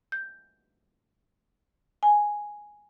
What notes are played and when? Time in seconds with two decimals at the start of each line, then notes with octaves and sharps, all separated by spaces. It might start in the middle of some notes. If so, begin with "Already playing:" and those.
0.12 G6
2.03 G#5